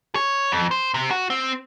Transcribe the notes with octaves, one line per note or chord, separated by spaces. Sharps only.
C#5
F2
C5
C3
F#4
C4